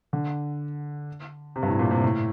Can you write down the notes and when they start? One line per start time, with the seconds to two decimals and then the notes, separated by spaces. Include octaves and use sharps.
0.13 D3
1.56 C3
1.63 G2
1.68 A2
1.79 A#2
1.91 C3
2.04 A2